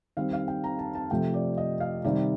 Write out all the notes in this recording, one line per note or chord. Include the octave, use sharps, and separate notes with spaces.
D#3 G3 C4 F5
F5
G5
A#5
A5
A5
C3 F3 A3 G5
D5
D#5
F5
C3 D#3 G3 D5